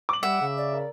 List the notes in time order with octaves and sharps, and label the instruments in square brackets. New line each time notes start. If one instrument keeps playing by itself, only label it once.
[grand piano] D6 F#7
[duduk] G3 [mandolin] E5 [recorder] F#5
[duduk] C#3
[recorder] D5
[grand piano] A#4